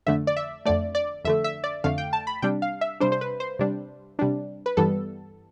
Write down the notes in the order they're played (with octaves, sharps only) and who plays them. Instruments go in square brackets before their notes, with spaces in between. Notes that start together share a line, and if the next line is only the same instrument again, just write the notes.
[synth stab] F2 D3 A3 E5
D5
E5
F2 D3 A3 D5
D5
F2 D3 A3 E5
E5
D5
F2 D3 A3 F5
G5
A5
B5
C3 G3 D4 G5
F5
E5
C3 G3 D4 C5
C5
B4
C5
C3 G3 D4
C3 G3 D4
B4
G2 E3 G3 B3 A4